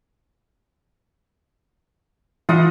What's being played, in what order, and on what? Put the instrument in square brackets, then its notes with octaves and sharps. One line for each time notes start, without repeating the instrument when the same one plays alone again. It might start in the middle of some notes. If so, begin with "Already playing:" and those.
[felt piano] E3 [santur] F4 D#5 F#5